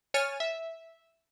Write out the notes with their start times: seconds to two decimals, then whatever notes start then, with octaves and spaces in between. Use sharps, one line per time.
0.14 C#5 G#5 F6 A6 D#7
0.40 E5